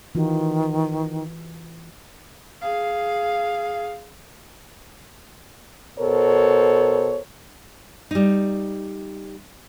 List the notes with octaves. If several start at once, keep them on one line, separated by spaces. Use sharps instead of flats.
D#3 E3 F4 F#4
G#4 F5
B2 A4 A#4 C5 C#5
G3 D#4